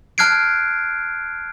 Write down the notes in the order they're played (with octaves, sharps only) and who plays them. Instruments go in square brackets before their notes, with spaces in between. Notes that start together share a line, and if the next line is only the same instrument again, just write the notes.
[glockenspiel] A5 F6 F#6 G#6 C7 D7